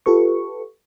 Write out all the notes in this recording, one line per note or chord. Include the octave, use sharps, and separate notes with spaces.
F4 G4 A4 B4 C#6